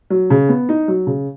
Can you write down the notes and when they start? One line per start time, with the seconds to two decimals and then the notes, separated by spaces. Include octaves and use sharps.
0.10 F#3
0.30 C#3
0.49 B3
0.69 D#4
0.88 F#3
1.07 C#3